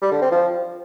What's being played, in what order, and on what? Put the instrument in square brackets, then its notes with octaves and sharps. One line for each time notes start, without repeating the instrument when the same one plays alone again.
[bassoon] G3
D3
C4
F3